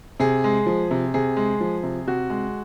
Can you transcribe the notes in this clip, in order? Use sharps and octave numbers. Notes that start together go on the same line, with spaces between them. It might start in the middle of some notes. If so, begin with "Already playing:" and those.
C3 G#4
G#3
F3
C3
C3 G#4
G#3
F3
C3
C3 F#4
G#3